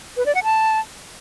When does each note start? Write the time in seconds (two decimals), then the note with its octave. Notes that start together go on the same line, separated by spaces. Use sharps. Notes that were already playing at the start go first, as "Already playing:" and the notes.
0.17 B4
0.26 D5
0.35 F#5
0.44 A5